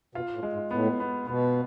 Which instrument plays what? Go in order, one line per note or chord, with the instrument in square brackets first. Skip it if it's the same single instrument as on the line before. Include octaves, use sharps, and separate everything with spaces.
[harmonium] B2 [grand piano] F4
[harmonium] A2
[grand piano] G#3
[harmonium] G#2
[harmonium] A2 [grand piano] B3
[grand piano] B3
[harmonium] B2 [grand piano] B3